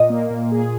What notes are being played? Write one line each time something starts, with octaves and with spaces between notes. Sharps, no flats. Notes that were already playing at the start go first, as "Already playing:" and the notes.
Already playing: A#2 D#5
A#3
A#2
G#4